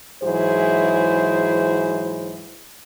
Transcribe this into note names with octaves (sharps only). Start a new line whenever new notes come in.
G#2 E3 F#3 E4 G#4 C5